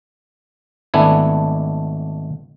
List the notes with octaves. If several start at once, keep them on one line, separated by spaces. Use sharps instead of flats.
G#1 A3 B3 D4 E4 G#5